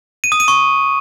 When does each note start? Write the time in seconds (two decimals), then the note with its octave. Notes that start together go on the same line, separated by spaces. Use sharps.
0.24 D#7
0.32 D#6
0.40 D#7
0.48 C#6